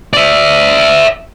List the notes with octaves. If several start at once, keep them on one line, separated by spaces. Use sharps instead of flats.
D5 E5